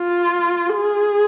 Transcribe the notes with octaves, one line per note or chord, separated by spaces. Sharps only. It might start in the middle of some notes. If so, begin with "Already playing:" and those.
Already playing: F4
G#4